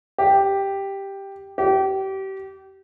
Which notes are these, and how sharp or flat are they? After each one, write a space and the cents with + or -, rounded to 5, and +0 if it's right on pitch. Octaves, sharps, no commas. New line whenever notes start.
G4 +0
G4 -30